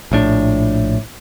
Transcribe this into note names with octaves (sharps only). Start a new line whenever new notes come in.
A#1 A2 D4